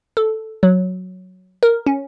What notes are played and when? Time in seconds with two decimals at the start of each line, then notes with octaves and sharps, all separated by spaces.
0.17 A4
0.63 F#3
1.63 A#4
1.87 C#4